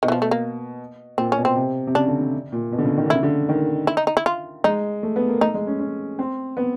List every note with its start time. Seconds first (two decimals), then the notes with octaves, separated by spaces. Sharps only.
0.03 B2 D#3
0.08 E3
0.12 F3
0.22 A3
0.31 A#3
1.18 A#2 C4
1.32 C#4
1.37 B2
1.45 C4
1.56 C3
1.87 C3
1.95 C#3 D4
2.08 D3
2.21 C#3
2.52 A#2
2.72 B2
2.78 D3
2.85 C#3
2.97 D#3
3.06 D3
3.10 C#3 E4
3.23 D3
3.49 D#3
3.87 E4
3.97 D#4
4.07 D#4
4.17 E4
4.26 F4
4.64 G#3 D#4
5.03 A3
5.16 B3
5.28 A#3
5.41 A3 D#4
5.54 G#3
5.67 C#4
5.79 C#4
6.19 C4
6.57 B3